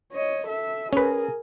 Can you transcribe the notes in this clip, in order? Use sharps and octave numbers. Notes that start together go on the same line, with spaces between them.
C#5 D#5
A4 E5
C#4 G#4 A#4 B4